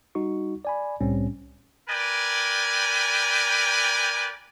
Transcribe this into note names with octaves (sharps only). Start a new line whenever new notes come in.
G3 D#4 F#4 C#6
D5 G#5 B5
C2 A2 G3 C4 C#4
A#4 B4 D5 G5 G#5